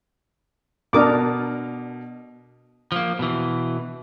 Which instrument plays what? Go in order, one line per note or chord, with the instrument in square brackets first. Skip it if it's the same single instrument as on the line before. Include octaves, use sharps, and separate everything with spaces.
[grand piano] B2 D#6 [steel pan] D4 A#4 D6
[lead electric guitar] F3 A#3
B2 E3